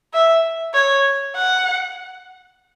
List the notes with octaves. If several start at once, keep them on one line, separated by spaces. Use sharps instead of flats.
E5
C#5
F#5